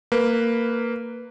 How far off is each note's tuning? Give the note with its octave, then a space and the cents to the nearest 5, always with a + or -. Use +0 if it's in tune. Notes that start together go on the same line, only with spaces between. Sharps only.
A#3 -15 B4 +0